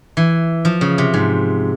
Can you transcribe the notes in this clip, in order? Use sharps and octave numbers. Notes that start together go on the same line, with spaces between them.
E3
F3
C#3
C3
G#2